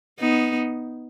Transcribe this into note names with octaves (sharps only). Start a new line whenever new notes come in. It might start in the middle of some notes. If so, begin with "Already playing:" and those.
B3 D#4